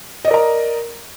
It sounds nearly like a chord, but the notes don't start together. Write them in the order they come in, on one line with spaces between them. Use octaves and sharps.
D#5 D5 A#4 A#5